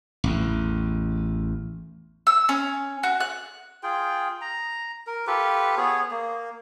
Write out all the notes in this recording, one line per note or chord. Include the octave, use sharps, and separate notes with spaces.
A1 E2
E6
C#4
F#4
F#6
F4 G#4 G5
A#5
A#4
F4 G4 A4 B4
B3 G#4 C#5
A#3